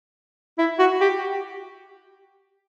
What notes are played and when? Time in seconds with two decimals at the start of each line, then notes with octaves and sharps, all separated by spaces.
0.58 E4
0.79 F#4
1.01 G4